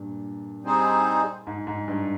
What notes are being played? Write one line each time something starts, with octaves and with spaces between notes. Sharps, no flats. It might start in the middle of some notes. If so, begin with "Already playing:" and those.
Already playing: G2 A#2
G3 C4 D#4 G#4 C5
G#2
G#2
G2